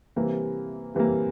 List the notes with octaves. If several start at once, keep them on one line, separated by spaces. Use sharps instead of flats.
C3 E3 G3 A#3
C3 E3 G3 A#3